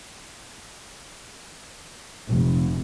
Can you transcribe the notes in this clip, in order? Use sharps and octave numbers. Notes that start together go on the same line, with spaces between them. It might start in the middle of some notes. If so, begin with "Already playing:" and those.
F1